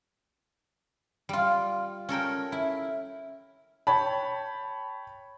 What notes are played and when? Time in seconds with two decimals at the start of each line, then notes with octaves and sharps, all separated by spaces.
1.29 G3 F4
2.09 C#4 A4 A#4 G5
2.52 E4
3.87 C#5 G5 A5 B5